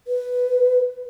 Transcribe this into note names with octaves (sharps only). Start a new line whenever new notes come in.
B4